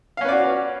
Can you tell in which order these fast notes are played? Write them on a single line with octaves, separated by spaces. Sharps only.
F5 C#4 B4 D5 F#4